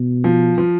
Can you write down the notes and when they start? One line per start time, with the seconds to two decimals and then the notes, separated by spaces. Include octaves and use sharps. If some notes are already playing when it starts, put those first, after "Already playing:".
Already playing: B2
0.24 F3
0.58 F3